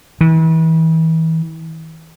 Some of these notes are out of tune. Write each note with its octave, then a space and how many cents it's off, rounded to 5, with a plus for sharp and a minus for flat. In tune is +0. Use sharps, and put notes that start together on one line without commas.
E3 -35